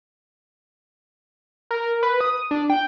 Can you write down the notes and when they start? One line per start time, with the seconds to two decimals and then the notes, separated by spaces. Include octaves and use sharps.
1.71 A#4
2.03 B4
2.21 D#6
2.51 D4
2.70 G5